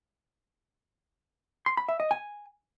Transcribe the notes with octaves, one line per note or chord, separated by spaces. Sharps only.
C6
B5
E5
D#5
G#5